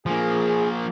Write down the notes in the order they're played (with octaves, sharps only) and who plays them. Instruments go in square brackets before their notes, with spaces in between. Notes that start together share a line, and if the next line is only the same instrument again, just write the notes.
[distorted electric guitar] F3 A#3 [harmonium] G#4